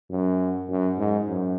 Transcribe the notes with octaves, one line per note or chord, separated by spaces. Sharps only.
F#2
F#2
G#2
F#2